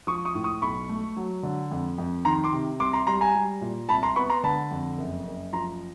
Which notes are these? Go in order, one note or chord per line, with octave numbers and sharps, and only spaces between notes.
F3 C#6 D#6
C#6 D#6
A2
C#6 D#6
B1 B5 C#6
A3
F#3
D3
F2
F2
D#3 A#5 C6
C6 D6
C3
C2 C6 D6
A#5 C6
G3 A#5 C6
G#5 A#5
G3
A#2
C2 A5 B5
A#5 C6
B3 B5 C#6
A#5 C6
D3 A5 B5
F2
F#1
F#1
F3 A#5 C6